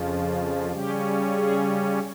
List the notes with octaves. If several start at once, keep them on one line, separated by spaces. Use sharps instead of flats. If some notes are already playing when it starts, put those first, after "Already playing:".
Already playing: F2 C#3 F3
C#3 G3 C#4 G4
G#4